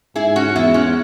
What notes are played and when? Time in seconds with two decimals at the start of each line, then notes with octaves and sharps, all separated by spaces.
0.16 G#2 E4 G#4
0.36 C#4 F#4
0.55 E2 B3 E4
0.74 G#3 C#4